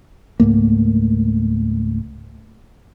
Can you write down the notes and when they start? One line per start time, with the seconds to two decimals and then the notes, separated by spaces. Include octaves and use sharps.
0.40 C#2 G#2 A3 A#3